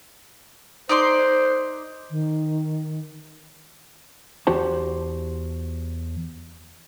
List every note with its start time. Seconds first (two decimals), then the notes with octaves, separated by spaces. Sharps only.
0.89 D#4 C5 D5 C6
2.11 D#3
4.47 E2 F#4 G4 C5 A5